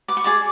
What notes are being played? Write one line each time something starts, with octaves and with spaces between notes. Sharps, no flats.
B4 D6
C#6
G#4 D5 D6